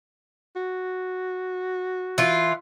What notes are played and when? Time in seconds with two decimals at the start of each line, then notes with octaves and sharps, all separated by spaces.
0.56 F#4
2.18 E3 F4